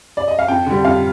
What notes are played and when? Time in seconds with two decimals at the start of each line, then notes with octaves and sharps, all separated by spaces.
0.17 D5
0.28 D#5
0.39 F5
0.48 F2 G5
0.66 D3 G3
0.85 F2 F5